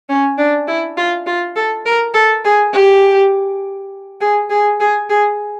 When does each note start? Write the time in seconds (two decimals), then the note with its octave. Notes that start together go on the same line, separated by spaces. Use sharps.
0.09 C#4
0.38 D4
0.68 E4
0.97 F4
1.27 F4
1.56 A4
1.86 A#4
2.14 A4
2.45 G#4
2.73 G4
4.21 G#4
4.50 G#4
4.80 G#4
5.10 G#4